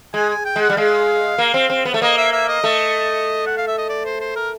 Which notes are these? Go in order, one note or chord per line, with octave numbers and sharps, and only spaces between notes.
G#3 G#5
G#5
G5
G#3
F#5
G3
G#3 F5
A#3
C4
C4
B3
A3
A#3 D#5
E5
E5
D#5
A3
F#5
F5
E5
D#5
D5
C5
C5
A#4